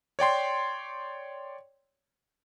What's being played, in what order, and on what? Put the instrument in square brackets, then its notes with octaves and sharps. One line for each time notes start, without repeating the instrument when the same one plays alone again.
[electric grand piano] C#5 D5 G5 C6